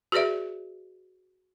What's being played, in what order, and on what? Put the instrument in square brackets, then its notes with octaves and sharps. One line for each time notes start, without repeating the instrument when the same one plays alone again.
[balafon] F#4 G#4 B4 D5 E5